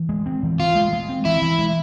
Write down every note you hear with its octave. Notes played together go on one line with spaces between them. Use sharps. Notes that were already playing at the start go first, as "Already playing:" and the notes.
Already playing: E3
G#3
C4
E3
E3 F4
G#3
G#3
C4
E3 E4
E3
G#3